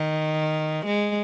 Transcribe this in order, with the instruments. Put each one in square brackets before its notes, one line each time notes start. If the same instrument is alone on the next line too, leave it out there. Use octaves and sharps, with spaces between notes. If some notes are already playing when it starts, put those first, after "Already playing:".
Already playing: [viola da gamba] D#3
G#3